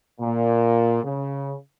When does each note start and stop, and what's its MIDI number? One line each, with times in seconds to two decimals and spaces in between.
0.20 0.99 46
1.04 1.55 49